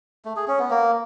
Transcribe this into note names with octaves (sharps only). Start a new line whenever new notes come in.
A3
G#4
C#4
B3
A#3